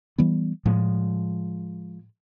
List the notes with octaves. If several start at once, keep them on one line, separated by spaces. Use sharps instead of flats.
E3 G3 B3
A2 F3 G#3